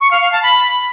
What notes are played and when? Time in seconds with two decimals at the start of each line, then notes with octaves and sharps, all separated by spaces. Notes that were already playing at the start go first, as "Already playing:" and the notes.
0.01 C#6
0.11 F5
0.22 F5
0.32 A5
0.43 B5